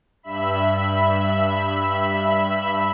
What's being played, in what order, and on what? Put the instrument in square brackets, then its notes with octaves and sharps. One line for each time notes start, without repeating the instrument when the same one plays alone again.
[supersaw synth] G2 E5 B5